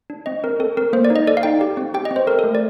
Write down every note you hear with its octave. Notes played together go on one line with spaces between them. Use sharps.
D4
C4 D#5
C4 A#4
C4 A4
C4 A#4
A#3 C5
D5
D#4
D#5
A4 D5
F5
D#4 G5
G4
C4
G4 G5
D#5
C4
C5
A4 A#4
A3 A4
D5